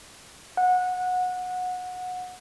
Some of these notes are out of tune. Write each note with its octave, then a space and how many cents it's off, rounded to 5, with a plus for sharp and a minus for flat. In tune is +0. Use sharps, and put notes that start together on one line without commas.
F#5 -20